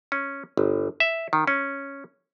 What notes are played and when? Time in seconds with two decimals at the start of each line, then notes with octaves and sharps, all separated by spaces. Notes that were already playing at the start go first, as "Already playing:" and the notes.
0.12 C#4
0.57 G1
1.00 E5
1.33 D#3
1.47 C#4